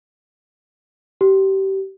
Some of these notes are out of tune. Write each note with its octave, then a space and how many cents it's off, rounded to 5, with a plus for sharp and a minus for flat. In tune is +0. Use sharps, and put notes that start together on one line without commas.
G4 -25